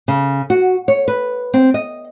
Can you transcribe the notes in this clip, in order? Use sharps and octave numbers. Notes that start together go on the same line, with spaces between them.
C#3
F#4
C#5
B4
C4
D#5